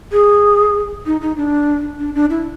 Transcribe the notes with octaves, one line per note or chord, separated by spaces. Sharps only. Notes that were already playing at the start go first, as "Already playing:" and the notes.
G#4
D#4
D#4
D4
D4
D4
E4